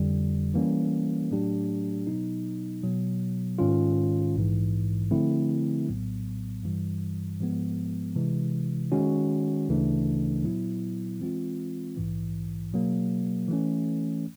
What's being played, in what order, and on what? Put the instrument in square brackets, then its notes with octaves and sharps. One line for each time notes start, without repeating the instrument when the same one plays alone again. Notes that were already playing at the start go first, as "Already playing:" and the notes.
Already playing: [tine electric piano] F2 D3 G3
E3 G3 A#3 C#4
A2 F#3 A3 D4 G4
B2 F#3 B3 D#4
B2 F#3 B3
G#2 D#3 G#3 C#4 F4
A#1 G#2 E3
D3 F3 A3 C4 E4
A#1 A2 F#3 B3
G2 E3 G3
G#2 F3 G#3 B3
C3 E3 G#3
D#3 G#3 C#4 F#4
D2 C#3 E3 A3 D4
A#2 F#3 B3 E4
E3 G#3 C4 F4
A#1 G#2 E3
B2 F#3 A#3
E3 A3 C#4